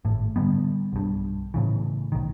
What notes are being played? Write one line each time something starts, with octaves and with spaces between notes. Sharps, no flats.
G#1 A2
D3 D#3 G3 B3
B1 G2
A2 C#3 E3
B1 D#3